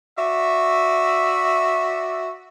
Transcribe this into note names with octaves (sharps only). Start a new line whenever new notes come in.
F#4 D5 E5